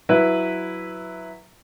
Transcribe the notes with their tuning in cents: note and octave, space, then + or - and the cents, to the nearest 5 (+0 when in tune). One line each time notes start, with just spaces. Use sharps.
F#3 +0 E4 +0 B4 +0